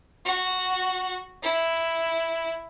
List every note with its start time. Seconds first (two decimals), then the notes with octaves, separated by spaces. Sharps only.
0.25 F#4
1.43 E4